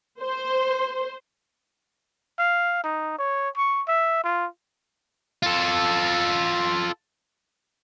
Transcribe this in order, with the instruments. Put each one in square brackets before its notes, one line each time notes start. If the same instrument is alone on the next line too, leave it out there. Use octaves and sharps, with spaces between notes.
[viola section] C5
[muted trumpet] F5
D#4
C#5
C#6
E5
F4
[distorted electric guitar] F4 A4